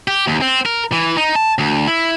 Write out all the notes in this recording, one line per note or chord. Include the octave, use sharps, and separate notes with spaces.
G4
D#2
C4
A#4
E3
D#4
A5
D2
E4